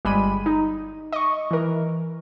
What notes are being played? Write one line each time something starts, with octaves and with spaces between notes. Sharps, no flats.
G1 G3 G#3 B5 D#7
D#4
D#5 C#6
E3 A#4